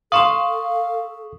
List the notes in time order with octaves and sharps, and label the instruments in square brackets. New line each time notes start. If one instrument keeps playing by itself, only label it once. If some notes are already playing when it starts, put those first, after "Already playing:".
[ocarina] A4 [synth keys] F5 [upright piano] C6 E7 F#7 [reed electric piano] C#6 D#6